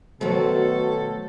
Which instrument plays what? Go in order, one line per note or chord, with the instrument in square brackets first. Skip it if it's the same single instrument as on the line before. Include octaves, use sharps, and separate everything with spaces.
[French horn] B2 [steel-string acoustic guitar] D#3 F#3 A3 [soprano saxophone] A4 [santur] C5 C#5